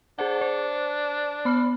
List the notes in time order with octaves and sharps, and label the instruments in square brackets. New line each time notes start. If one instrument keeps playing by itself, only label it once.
[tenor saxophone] D4 [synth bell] G#4 C5 F#5
[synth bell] C5
B3 B5 F6